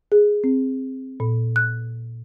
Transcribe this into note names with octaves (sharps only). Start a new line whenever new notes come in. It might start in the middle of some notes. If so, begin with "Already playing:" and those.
G#4
C4
A#2
F#6